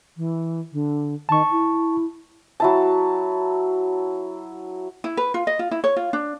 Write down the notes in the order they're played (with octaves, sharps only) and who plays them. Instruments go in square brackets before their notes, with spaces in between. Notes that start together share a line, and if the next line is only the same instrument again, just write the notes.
[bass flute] E3
D3
[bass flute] D#3 [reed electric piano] A5 C#6
[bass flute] E4
[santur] F#3 E4 A5
[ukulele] E4
B4
F4
D#5
F4
E4
C#5
F4
D4